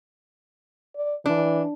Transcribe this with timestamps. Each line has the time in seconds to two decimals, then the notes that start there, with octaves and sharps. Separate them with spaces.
0.96 D5
1.26 E3 D4